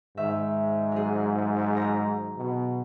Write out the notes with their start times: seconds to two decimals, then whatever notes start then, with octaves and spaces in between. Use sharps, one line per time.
0.17 G#2 D#3 E5
0.92 F#3 G#4
1.76 A#5
2.38 B2